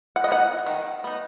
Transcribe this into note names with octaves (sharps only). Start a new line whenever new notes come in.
F#5
D#5
B3 D#4 F#5
D#3
B3 D#4